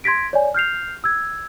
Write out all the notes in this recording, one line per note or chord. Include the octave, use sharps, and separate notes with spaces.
C6 G#6 A#6 B6 D7
C#5 D5 G#5
F6 G6 C7 F7
E6 G#6